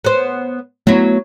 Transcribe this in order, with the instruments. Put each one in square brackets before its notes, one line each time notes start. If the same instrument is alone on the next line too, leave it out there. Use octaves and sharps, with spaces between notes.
[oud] B3 C5
[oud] F#3 E4 [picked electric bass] A3 B3